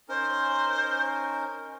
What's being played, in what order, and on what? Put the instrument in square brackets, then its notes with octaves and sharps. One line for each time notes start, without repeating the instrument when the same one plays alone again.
[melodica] C#4 D#4 A#4 [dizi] C5